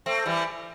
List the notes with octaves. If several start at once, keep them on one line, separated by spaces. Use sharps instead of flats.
A3 C4
E3 G3